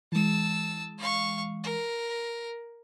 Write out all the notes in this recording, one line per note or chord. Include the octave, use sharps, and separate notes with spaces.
E3 G#3 A5 E6
F5 C#6
A#4